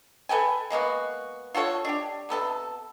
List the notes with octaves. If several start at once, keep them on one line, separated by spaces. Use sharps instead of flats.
A4 B4 G5 G#5
G#3 A#3 B3 F#4
F4 F#4 A4 C#5
D4 G4
C3 B3 A4 A5